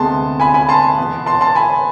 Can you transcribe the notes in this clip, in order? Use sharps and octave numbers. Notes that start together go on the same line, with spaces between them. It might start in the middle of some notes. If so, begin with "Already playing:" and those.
Already playing: D2 C3 G#3 B3 A5 C6
G#5 B5
G#5 B5
A5 C6
E2 B2 B3
A5 C6
A5 C6
G#5 B5